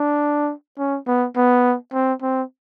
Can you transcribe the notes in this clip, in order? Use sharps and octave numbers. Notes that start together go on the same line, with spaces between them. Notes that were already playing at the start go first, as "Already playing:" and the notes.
Already playing: D4
C#4
B3
B3
C4
C4